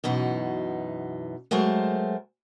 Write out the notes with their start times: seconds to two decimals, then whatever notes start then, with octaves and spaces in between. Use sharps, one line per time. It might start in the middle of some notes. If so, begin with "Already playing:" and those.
0.04 F#2 B2 E3 D#4
1.51 F#3 G#3 A3 A#4 C5